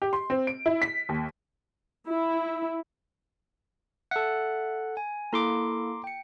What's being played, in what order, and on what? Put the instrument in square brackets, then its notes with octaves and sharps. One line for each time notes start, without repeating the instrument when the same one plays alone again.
[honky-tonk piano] G4
C6
C4
D7
E4
B6
D#2
[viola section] E4
[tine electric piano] A4 F#5 [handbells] E5
[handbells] G#5
[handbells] A#3 E4 A4 [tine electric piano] A#5 C6 D6
[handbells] G5 C#7